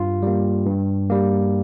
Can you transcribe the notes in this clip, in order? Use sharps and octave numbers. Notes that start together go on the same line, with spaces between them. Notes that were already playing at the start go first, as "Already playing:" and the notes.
Already playing: G2 F4
G3 A#3
G2
G3 A#3